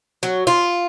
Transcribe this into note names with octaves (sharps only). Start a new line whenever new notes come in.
F#3
F4